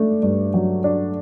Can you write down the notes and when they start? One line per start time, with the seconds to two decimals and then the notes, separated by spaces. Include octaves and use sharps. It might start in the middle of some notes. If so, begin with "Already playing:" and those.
Already playing: A3 D4
0.23 G2
0.54 F#3
0.84 D4